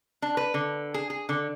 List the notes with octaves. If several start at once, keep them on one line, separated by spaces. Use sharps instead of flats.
D4
B4
D3
G#4
G#4
D3